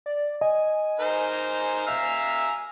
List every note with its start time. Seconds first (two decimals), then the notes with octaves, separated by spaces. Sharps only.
0.06 D5
0.41 D#5 G#5
1.00 D#4 A#4 C5
1.87 E5 F5 A#5